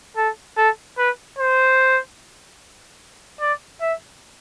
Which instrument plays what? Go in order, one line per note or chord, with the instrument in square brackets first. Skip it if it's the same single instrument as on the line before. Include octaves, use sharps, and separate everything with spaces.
[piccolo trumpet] A4
A4
B4
C5
D5
E5